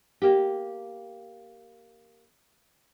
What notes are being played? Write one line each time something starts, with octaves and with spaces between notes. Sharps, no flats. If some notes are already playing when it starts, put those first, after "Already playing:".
A#3 G4